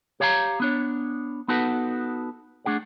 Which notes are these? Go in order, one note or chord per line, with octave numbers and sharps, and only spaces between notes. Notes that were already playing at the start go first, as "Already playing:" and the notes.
G4 C#5 F5 G5 A#5
B3 D4 C#5
B3 D#4 F#4 A4 B4 F#5
A3 D4 G#4 F#5